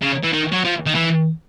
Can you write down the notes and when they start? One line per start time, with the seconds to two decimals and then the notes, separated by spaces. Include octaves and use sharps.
0.02 C#3
0.23 E3
0.33 D#3
0.52 F#3
0.64 F3
0.86 D#3
0.95 E3